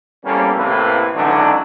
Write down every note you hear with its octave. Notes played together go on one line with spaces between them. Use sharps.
A#1 E2 G3 A#3 C#4 A4
A1 A2 C3 E3 A#3 B4
C#2 D3 E3 F#3 D4 D#4